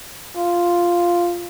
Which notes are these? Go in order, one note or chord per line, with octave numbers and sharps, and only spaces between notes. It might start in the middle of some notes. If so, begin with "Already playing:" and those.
F4